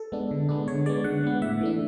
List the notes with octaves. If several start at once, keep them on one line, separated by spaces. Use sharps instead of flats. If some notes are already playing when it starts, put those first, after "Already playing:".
Already playing: A4
G#3 B3 D4
D3
G#3 B3 D4
D3 C#5
G#3 B3 D5
D3 F#5
G#3 B3
A2 E5
E3 A3 D4